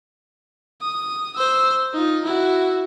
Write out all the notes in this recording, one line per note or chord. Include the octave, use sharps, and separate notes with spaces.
D#6
C5 E6
D#4 F4
E4 F#4